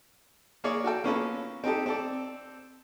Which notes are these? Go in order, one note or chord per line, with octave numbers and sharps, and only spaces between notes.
A#3 G#4 C#5 D5
F#4 A4 G5
A#3 B3 C#4 F4 A4 B4
C4 D#4 G4 A4
C4 A4 D5